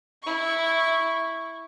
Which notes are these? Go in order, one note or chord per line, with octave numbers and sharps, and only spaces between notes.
E4 C#6